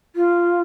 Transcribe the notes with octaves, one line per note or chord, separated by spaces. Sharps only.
F4